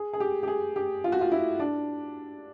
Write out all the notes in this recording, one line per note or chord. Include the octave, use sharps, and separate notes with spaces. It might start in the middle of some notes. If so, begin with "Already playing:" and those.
Already playing: G#4
G#4
G4
G4
G#4
G4
F4
F#4
F4
E4
D4